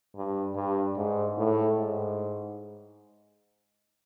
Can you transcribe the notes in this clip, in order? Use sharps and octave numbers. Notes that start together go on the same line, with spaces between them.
G2
G2
G#2
A2
G#2